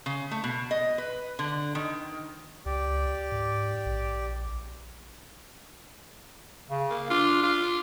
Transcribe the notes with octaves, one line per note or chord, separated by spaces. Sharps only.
C#3
A3
B2
D#5
B4
D3
D#3
C#2 G4 D5
G#2
A#1
C#3
A#3
D4 F4
F4